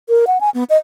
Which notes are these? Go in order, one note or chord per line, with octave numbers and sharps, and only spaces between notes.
A#4
F#5
G#5
B3
D#5